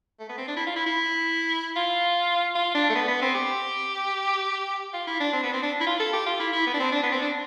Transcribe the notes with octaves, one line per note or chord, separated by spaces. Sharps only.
A3
B3
C4
D4
E4
F4
E4
E4
F4
F4
D4
A3
B3
B3
C4
G4
F4
E4
D4
C4
B3
C4
D4
E4
F4
A4
G4
F4
E4
E4
B3
D4
C4
D4
B3
C4
D4